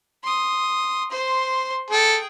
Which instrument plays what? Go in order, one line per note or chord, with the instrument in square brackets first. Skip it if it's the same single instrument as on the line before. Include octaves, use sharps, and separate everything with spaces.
[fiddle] C6 D#6
C5 C6
[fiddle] G#4 G5 [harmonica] A4